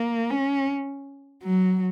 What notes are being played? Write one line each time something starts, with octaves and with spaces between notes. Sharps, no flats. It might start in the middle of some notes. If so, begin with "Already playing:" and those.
Already playing: A#3
C#4
F#3